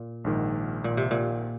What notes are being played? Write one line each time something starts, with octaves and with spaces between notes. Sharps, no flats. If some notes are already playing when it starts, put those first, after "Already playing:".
Already playing: A#2
A#1 G#2 D#3
A#2
C3
A#2